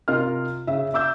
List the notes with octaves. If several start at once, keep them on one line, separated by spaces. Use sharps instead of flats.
C3 F4 A#4 D#5 F6
C#3 E5
E5 D6 E6 G6